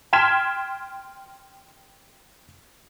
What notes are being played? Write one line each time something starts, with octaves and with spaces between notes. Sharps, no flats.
G5 C6 F6 G#6 B6 E7